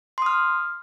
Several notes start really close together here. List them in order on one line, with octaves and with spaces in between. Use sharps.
C6 D#6 F6